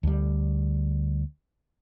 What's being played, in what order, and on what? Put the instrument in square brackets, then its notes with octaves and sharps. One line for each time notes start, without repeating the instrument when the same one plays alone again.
[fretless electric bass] D2 G3